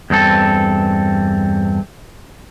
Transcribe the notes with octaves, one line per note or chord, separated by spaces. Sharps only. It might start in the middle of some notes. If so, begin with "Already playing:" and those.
E2 G2 C4 A4